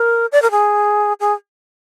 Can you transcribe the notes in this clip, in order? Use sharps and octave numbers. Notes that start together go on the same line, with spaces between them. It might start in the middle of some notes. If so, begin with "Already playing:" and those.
Already playing: A#4
D5
A#4
G#4
G#4